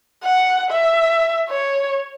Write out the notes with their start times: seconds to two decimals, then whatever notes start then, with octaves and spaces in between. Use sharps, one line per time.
0.23 F#5
0.70 E5
1.50 C#5